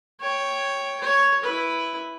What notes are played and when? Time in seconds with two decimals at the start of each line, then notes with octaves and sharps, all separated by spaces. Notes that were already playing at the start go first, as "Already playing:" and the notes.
0.20 C#5 G5
1.00 C#5
1.44 E4 B4